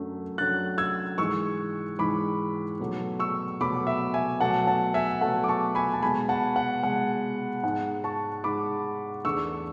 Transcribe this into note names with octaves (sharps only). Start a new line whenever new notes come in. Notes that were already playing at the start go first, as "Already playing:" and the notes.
Already playing: F#2 D3 F#3 A3
F#2 D3 F#3 A3 F#6 A6
E6 G#6
G#2 E3 G#3 C#6 E6
G#2 E3 G#3 B5 D6
B2 F#3 A3
C#6 E6
B2 F#3 A3 B5 D6
E5
E5 G#5
B2 F#3 A3 F#5 A5
F#5 A5
E5 G#5
B2 F#3 A3 F#5 A5
D6
A5 C#6
G#5 B5
A5
B2 G#3 G#5 B5
F#5 A5
F#5
B2 G#3 F#5
G#2 G#3 F#5
A5 C#6
G#2 G#3 B5 D6
E2 D3 A3 C#6 E6